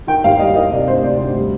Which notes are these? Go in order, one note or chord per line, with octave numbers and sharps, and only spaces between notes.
D#3 G5
D#2 F5
G3 D#5
D#3 D#5
C3 D5
D2 C5
C3 D5
D2
G3